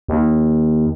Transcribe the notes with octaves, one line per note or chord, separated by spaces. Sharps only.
D#2